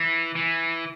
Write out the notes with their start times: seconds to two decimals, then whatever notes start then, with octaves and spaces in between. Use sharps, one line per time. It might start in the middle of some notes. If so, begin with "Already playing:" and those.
Already playing: E3
0.35 E3